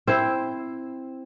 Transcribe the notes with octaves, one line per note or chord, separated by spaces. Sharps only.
C4 E4 C5